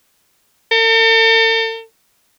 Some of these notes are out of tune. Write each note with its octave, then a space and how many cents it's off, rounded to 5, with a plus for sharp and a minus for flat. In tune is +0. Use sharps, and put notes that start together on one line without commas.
A4 +45